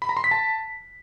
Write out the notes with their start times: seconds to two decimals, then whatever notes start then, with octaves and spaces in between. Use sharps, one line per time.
0.02 B5
0.09 A#5
0.17 C6
0.24 B6
0.31 A5